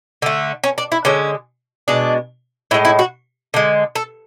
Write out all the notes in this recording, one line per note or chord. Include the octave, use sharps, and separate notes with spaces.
D3 A3
C#4
D4
E4
D3 G#3 C#4
B2 G#3 D4
A2 G#3 E4
E4
F#4
D3 G#3
A4